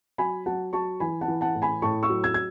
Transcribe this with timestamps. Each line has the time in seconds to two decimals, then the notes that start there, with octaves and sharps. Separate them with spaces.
0.18 F#3 G#5 B5
0.46 F#3 F#5 A5
0.73 F#3 A5 C#6
1.00 E3 G#5 B5
1.21 F#5 A5
1.28 E3
1.41 F#5 A5
1.55 A2
1.62 G#5 B5
1.82 A2 A5 C#6
2.03 C#6 E6
2.10 F#3
2.23 E6 G#6
2.34 G#6